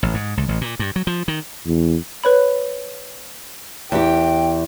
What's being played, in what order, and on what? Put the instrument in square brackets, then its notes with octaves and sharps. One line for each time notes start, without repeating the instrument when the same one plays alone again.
[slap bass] A1
G#2
C#2
A1
A#2
G2
F#3
F3
D#3
[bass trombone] E2
[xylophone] B4 C#5 B5
[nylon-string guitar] E2 G4 [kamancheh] G5